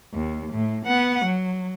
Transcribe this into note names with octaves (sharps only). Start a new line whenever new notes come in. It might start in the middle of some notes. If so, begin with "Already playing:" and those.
D#2
A2
B3 F#5
F#3